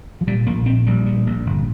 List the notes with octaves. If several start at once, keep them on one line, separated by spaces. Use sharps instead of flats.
F3
A#2 G3
A#1 A#3
A#2 C4
A#1 G3
A#2
A#1
G1